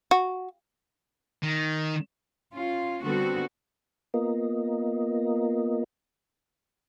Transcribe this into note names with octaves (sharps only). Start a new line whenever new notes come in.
F#4
D#3
C#4 F4
D3 G3 B3 C4 F#4 A4
A#3 B3 F4 A#4 D#5